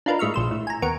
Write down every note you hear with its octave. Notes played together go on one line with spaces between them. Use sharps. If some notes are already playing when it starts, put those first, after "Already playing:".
D4 D#4 F4 A#4 B4
A2 G#3 E5 C#6 F6
A#1 C5 E6
A2
G#5 A#5
D#2 B3 A#4 C#6 D7